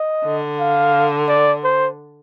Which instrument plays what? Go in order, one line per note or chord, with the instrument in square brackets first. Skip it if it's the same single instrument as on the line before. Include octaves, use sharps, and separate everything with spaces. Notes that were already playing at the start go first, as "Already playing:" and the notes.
Already playing: [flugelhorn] D#5
[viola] D3
[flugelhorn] F5
D5
C5